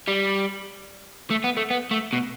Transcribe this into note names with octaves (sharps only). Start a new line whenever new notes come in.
G3
A3
B3
A3
B3
A3
B2